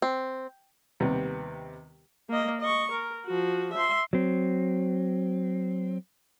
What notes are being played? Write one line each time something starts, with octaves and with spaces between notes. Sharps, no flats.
C4
D#2 C3 G3 B3
A#3 D#5
D#5 C#6
A#4
F3 F#4
E5 C6
F#3 C4